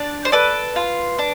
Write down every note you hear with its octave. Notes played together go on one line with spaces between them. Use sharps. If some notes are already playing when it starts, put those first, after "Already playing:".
Already playing: D4 D5
C5
A4 B4 D5
F4
D4